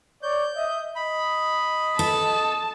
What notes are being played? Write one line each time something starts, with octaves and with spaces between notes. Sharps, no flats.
C#5 D5 G6
D#5 E5
D#5 B5
A4 A5